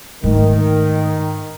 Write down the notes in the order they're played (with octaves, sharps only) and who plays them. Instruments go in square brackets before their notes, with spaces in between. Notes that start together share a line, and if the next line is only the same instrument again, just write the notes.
[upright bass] G#2 A3 [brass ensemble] D#3